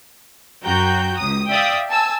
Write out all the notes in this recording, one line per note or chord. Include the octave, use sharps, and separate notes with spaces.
F#2 F#4 G5 A#5 G6
C#2 D#6
D5 E5 F5 G5 D#6
G#5 A5 E6